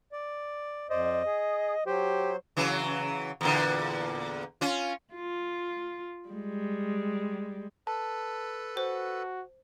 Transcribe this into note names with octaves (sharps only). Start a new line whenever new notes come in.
D5
F2 C5 D5 D#5
G#4
F#3 G4 C5
C#3 E3 F#3
E2 A#2 D3
C#4 F4
F4
G3 G#3
A4 B4 A5
F#4 C5